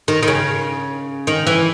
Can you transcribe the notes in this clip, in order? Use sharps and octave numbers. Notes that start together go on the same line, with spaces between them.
D#3
D#3
C#3
D#3
E3